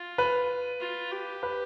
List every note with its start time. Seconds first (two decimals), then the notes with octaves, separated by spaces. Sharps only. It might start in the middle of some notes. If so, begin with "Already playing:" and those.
Already playing: F4
0.18 B4
0.81 F4
1.12 G4
1.43 B4